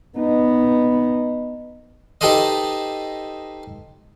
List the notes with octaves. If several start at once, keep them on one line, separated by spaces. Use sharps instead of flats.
B3 D#4
D#4 G4 A4 B4 C5 D#5